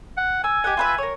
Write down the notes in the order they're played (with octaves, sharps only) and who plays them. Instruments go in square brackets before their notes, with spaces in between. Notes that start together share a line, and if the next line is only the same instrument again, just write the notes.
[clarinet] F#5
[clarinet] G#5 [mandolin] E6
[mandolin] G4 D#5 F#5
F4 B4 E5
A#4 C#5